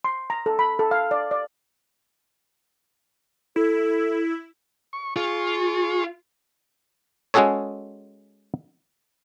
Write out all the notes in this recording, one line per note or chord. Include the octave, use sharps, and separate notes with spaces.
C6
A#5
A4
B5
A4
F5
D5
D5
E4 A4
C#6
F4 G#4 C#6
G#3 C#4 F#4 G#4 A4 C#5